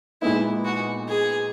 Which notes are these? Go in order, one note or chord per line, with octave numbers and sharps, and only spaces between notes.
A#2 G#3 B3 D#4 E4
F#4
G#4